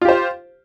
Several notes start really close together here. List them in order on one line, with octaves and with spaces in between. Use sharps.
F4 G4 C5